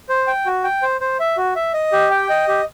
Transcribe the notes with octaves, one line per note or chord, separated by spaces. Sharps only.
C5
G5
F#4
G5
C5
C5
E5
F#4
E5
D#5
G4
G5
D#5
G4